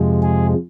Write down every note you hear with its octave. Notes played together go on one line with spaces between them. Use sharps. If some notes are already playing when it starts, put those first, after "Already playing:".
Already playing: F2 C3 F3 G#3
G#4